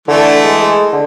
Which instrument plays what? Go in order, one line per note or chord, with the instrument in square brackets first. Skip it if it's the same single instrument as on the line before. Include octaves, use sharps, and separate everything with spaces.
[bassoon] D3 [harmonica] E3 A3
[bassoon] G#3
G#3
D3